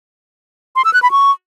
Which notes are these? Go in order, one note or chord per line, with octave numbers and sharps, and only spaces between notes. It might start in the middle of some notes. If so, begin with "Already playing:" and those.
C6
E6
F#6
B5
C#6